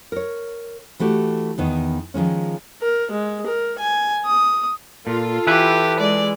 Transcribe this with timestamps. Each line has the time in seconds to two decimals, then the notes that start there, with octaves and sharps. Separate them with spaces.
0.12 A#4 C#5
1.00 E3 A3 F#4 G4
1.58 E2 D#3 B3
2.14 D#3 F3 G#3 C#4
2.82 A#4
3.11 G#3
3.47 A#4
3.79 G#5
4.25 D#6
5.07 A#2 F4 A4
5.47 E3 E4 G4 B4
6.00 G#3 D5